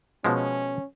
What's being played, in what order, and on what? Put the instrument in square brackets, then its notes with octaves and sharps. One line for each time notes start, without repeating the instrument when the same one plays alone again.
[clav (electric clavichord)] B2 F3 G#3 [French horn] C#4